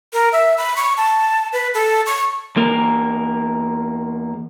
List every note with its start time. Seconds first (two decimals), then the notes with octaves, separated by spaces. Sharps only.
0.13 A#4
0.32 E5
0.58 B5
0.76 C#6
0.97 A5
1.53 B4
1.74 A4
2.06 C#6
2.56 E2 A#3 A#4